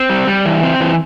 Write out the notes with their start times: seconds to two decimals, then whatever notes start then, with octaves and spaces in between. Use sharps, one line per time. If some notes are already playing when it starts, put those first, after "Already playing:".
Already playing: C4
0.10 G3
0.27 G3
0.45 E3
0.63 C4
0.80 E3